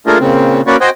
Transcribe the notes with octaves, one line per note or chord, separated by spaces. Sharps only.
A3 A#3 D4 F4 G#4 A#4
A#2 C#3 C4
A#3 C#4 F#4 B4 C#5 D5
F#4 C5 D#5 G5 G#5